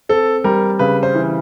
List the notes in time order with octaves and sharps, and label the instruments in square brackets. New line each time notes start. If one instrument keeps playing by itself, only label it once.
[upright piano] C4 [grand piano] A4
[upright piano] G3 [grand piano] A#4
[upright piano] C#3 [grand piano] B4
[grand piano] C5
[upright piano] E3